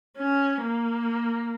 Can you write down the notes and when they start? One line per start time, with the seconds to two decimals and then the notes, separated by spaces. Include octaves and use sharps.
0.17 C#4
0.62 A#3